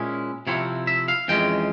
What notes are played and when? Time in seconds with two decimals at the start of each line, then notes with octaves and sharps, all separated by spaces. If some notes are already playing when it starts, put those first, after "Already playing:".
Already playing: A#2 G#3 C#4 E4
0.47 C3 F3 C4 E4 C#5
0.87 E5
1.08 F5
1.28 F2 E3 G#3 C#4 G5